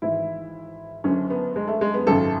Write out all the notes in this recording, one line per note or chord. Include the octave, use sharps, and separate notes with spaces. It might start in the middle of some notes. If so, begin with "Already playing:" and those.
G#1 G#2 E3 E4
F#1 F#2 D3 C#4
B3
G#3
A3
G#3
B3
G#1 F#2 C#3 A4